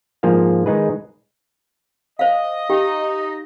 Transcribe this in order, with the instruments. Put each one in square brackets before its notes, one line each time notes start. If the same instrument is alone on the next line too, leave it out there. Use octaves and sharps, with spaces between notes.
[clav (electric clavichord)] G#2 F3 A#3 G#4 F5
D#3 G#3 D#4 G#4 B4
[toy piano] C5 F5 [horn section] D#5
[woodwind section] D#4 [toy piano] G4 G5